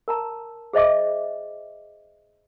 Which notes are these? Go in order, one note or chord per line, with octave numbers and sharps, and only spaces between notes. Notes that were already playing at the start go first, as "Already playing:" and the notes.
A#4 A5 A#5
G#4 C5 D#5 E5 D6